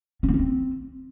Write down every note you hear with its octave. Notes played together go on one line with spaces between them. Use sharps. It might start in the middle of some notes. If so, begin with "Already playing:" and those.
C#4
B3
C#4
C4